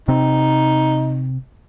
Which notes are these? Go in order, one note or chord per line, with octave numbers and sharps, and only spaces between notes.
C3 C4 D#4